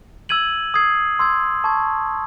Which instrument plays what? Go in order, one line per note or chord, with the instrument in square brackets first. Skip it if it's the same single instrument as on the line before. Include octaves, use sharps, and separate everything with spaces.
[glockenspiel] E6 G#6 D#7 F#7
D#6 G#6 C7
C6 E6 G#6
A5 C#6 G#6